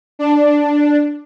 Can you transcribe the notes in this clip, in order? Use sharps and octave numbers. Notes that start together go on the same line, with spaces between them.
D4